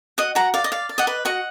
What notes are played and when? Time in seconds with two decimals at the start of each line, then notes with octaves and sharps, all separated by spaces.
0.18 F#4 D#5 F#5
0.35 F#4 F#5 A#5
0.54 D5 F5
0.64 D#5
0.72 D5 F5
0.89 D5
0.98 D#5 F#5
1.07 B4
1.25 F#4 D#5 F#5